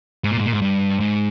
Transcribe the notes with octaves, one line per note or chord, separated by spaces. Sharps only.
G#2
A#2
G#2
A#2
G#2
G2
G#2